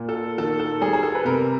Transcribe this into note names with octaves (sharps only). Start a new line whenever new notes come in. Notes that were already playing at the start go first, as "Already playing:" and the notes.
Already playing: A#2
A4
D#3 A4
A4
G3 G#4
G#4
A4
B4
C3 A#4